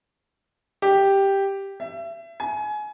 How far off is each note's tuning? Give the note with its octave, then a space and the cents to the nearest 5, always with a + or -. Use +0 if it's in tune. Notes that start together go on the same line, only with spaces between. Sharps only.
G4 +0
E5 +30
G#5 +25